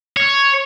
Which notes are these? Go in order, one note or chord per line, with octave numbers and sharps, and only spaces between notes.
C#5